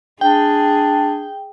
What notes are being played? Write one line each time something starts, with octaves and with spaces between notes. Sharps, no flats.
D4 G#4 G5